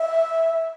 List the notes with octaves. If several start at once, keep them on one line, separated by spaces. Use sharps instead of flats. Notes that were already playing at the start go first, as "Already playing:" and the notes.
Already playing: E5